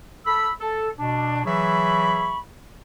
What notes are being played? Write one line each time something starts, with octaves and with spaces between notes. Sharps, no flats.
A4 B5 E6
A4
B2 D4
E3 F#3 G#4 E5 B5 C#6